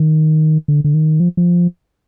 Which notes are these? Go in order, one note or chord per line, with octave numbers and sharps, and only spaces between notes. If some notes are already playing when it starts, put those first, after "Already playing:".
Already playing: D#3
D3
D3
D#3
F3
F3